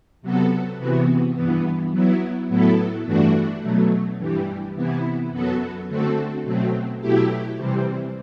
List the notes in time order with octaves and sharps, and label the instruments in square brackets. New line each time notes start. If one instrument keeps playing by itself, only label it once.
[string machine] C3 F#3 B3 F#4 A4
C3 E3 B3 F#4
G2 E3 B3
F#3 B3 E4
A2 F#3 B3 E4 A4
G2 E3 A3 D4 F#4
B2 F#3 A3
G2 E3 G3
C3 E3 B3 E4
F#2 F#3 B3 F#4 A4
D3 A3 C4 F#4 A4
B2 F#3 A3 C4
B2 F#3 A3 E4 G4
C3 E3 G3 C4